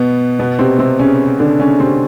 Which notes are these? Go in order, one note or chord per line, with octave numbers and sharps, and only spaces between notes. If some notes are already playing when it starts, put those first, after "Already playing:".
Already playing: B2 B3
B2 B3
C3 C4
C3 C4
C#3 C#4
D3 D4
C#3 C#4
C3 C4